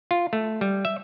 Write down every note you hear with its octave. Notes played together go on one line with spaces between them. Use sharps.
F4
A3
G3
E5